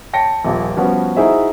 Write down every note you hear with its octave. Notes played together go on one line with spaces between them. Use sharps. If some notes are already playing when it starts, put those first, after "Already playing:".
C#5 G5 A5 A#6 C#7
D#1 A#1
F3 G3 B3 C#4 F#4
D#4 E4 F#4 G#4 C5 E5